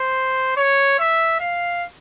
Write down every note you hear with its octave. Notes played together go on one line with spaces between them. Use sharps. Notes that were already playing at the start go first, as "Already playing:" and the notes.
Already playing: C5
C#5
E5
F5